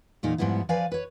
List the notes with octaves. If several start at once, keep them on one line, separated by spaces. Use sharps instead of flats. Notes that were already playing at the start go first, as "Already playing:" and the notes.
E2 A#2 D#4 G#4
G#2 F3 G3 B3 E4
F3 B4 D5 F5 G#5
B4 C#5